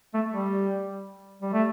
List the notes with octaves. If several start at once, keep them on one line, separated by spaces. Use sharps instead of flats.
A3
G3
G3
A3